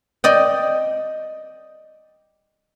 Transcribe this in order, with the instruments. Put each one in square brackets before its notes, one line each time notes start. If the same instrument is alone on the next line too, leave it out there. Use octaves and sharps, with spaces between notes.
[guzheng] D5 D#5 G5